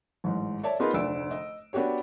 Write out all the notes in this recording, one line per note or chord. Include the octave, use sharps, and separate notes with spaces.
A1 G#2
C#5 D5 E5 A5
B3 D#4 F4 G#4 A#4 B4
F1 D2 D5 E6 D7
D#5
B3 D4 F#4 G4 C#5